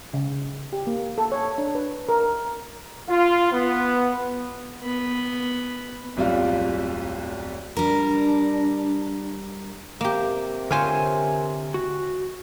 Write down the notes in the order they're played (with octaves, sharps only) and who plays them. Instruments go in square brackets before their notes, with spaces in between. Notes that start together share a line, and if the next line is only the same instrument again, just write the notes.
[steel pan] C#3
G4
A#3
A4
C#5
D4
B4
A#4
[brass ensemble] F4
B3
[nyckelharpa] B3 B5
[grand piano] D1 B1 F2 G3 F4 F5
[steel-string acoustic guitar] G3 A#4 [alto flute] D4
[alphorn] C3 [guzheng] A#3 G4
[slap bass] D3 [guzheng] F4 C5 C#5 [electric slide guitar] A#4 G#5
[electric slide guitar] F#4